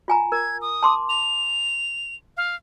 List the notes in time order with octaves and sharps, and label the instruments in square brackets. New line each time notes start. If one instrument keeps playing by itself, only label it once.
[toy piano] F4 G#5 A#5
[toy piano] A#4 [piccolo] G#6
[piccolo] D#6
[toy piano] A5 C6 D6
[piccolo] F7
F5